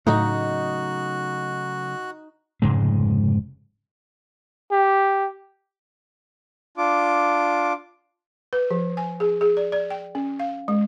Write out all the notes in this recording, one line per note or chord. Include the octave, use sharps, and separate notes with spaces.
A2 C#3 F#3 A3 D#4 F#4 F#6
F1 G#2 C#3 G#3
G4
D4 F4 D6
B4
F3
G#5
G#4
G#4
D5
D5
G5
C#4
F5
G#3